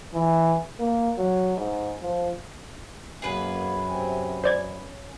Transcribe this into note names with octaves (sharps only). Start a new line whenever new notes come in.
E3
A#3
F#3
G#2
F3
F#2 A#3 B3 G#4 B4
C3 C4 G#5
C#4 C5 D5 G#6